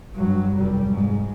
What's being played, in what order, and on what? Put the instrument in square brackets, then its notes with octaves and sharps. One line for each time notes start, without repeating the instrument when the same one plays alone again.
[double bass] G2 F#3
F1 G3
G#2